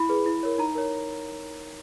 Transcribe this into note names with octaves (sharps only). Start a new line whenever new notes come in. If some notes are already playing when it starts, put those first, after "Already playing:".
Already playing: E4 B5
G#4 B4
E4
A#4 C#5
D#4 A#5
A#4 C#5